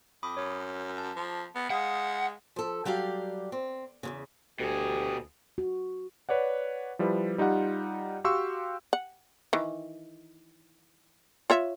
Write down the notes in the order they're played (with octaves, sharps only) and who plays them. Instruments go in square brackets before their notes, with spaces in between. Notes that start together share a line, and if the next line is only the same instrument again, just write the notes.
[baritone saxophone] F2 [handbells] B5 D6 D#6
[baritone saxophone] F#2 [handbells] C#5
[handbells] A5
[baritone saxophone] F3
B3
[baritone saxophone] G#3 [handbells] F5 D#6 [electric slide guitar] F#5
[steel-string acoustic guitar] F3 A4
F#3 G3 G4 D5 F5
C4
E2 A#2 C#3
[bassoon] D2 [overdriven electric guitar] B2 G#4 [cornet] G4
[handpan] F#4
[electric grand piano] B4 C#5 D5 F#5
F3 G3 E4 B4
G3 D#4 F4 G4 F#5
F#4 G4 F5 C6 C#6 E6
[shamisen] F#5
D#3 E3
F4 C#5 E5